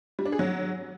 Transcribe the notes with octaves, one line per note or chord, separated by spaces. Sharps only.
G3
D4
G#4
F#3